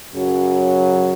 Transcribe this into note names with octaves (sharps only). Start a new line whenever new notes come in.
F#2 C#3 F#3